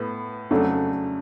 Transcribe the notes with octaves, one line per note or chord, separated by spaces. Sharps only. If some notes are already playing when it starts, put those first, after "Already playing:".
Already playing: A2 B3
F2 C#3 F#3 A3 D4